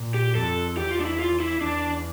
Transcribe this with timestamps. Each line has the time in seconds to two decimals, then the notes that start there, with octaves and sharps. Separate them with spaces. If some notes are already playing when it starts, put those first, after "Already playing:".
Already playing: A#2
0.14 G4
0.35 F2 A4
0.77 E2 G4
0.91 F4
1.00 D4
1.05 E4
1.19 F4
1.40 E4
1.61 E2 D4